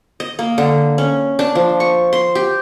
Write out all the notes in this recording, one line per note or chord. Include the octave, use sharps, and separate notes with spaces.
D#5
A#3
D3
C#4
D4
F3
C#6
C6
G4